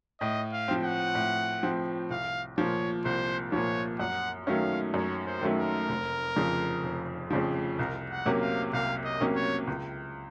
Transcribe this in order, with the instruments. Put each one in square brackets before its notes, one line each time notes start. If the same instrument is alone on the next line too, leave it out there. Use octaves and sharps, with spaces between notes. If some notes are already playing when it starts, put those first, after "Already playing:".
[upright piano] A2 [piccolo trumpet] D#5
[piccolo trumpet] F5
[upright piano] F3 C4
[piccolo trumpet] F#5
[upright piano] A2
F3 C4
[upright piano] C2 [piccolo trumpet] F5
[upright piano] A#2 F3 [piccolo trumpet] C#5
[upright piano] C2 [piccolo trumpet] C5
[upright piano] A#2 F3 [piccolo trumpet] C#5
[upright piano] F#2 [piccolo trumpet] F#5
[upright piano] D#3 F#3 A3 C#4 [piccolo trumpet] F5
[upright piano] F#2 [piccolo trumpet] C#5
[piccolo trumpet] C5
[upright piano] D#3 F#3 A3 C#4
[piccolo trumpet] A#4
[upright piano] F1
F2 C#3 F3
F1
F2 C#3 F3
[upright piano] C2 [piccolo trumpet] A#4
[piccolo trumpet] F#5
[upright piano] C3 F#3 A#3 C#4
[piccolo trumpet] F5
[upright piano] C2 [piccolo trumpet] F5
[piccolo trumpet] D#5
[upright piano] C3 F#3 A#3 C#4
[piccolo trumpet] C#5
[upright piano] C#2